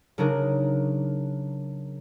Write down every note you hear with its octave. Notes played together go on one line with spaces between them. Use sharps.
C#3 F#3 D4 D#4 A#4